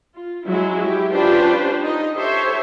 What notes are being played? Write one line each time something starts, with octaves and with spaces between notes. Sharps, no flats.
F4
F#3 G#3 C#4 E4
E4 G4
C#4 D4 F4 G4 B4 C5
D#4 D#5
G4 A4 C5 C#5 E5